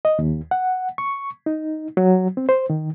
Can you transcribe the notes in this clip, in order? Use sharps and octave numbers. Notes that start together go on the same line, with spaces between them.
D#5
D#2
F#5
C#6
D#4
F#3
C4
C5
D#3